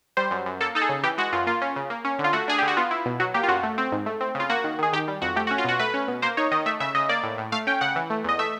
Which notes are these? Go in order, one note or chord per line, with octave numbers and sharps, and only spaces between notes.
G3 C5
F#2
F#2
A#3 A4
D#4 A4
G#4
C#3
E3 G4
G#3 F#4
F#2 F4
A#3 F4
C#4
C#3
A#3
C#4
D3
F4
A3 F#4
D4 G#4
D3 G4
F#4
B3 F4
E4
B2
F#3 F#4
A#3 G4
F4
F#2 F#4
A3
C4
G#2
A3
C4
C#3 F4
A#3 F#4
D#3
D#3 G#4
D#3 G4
G3
F2 F#4
A3 G4
F#4
C#4
F4
B2 F#4
A3 B4
C#4
B2
A#3 C5
D#4 C#5
D#3 D#5
A3 E5
C#3 E5
C#3 D#5
A#3 D5
A2
A2
A3 F5
C#4 G5
C#3 F#5
E3
A3
E2 D#5
A3 E5